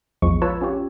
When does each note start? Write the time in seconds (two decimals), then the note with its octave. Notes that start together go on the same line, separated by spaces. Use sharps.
0.22 A#1 E2 F3 G#3 C#6
0.42 F4 B4 C#5 A5 E6
0.61 C#4 F4 G4 C#5